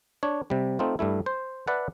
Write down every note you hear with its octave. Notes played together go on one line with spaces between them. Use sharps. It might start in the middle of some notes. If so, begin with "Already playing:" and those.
D4 C#5
C3 G3
A3 C4 D#4 F4
G2 G3 A3 E4
C5
B4 D5 E5 F#5 A5